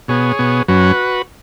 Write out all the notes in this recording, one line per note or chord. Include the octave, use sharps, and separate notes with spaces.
B2 B3 G#4 C#5
B2 B3
F#2 F#3 C#4 F#4 B4